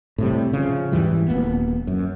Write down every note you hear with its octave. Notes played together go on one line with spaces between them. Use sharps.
A2 C3 G3
C#3 F3
E2 G#2 E3 G3
D#1 G#1 A#3 B3
F#2